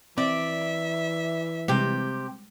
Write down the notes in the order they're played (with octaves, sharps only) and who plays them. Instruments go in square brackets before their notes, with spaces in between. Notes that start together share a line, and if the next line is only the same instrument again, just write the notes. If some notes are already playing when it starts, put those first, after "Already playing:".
[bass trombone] E3 [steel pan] C4 [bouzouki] D5 [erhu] E5
[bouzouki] C3 G4 [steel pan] G3 G#3 G5